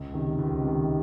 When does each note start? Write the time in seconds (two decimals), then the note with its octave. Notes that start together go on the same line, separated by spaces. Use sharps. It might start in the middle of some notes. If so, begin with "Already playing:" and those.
Already playing: C#2
0.14 C3 D#3
0.39 C#2
0.63 C3 D#3